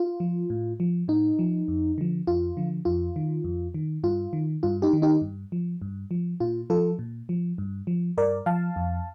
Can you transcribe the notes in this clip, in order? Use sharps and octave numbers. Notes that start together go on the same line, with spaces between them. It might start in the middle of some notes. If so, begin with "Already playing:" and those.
Already playing: F4
F3
A2
F3
A2 D#4
F3
F2
D3 F3
F2 F4
D3 F3
F2 F4
D#3
F2
D#3
G2 F4
D#3
G2 F4
D#4 G4
D#3
D#4 G4
G2
F3
G2
F3
A#2 F4
F3 F4 A4
A#2
F3
G2
F3
G2 A#4 D5
F3 F5 A5
F2